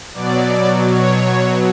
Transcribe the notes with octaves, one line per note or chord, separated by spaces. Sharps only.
B2 F#3 D5
C#5